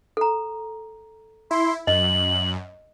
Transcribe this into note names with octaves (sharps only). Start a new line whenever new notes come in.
A4 A#5
E4 C6
F#2 D#5 F#7